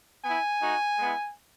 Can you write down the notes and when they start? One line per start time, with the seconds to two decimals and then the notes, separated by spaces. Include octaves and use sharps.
0.23 B3 E4 G#5
0.61 A3 D#4 F#4
0.99 G#3 B3 E4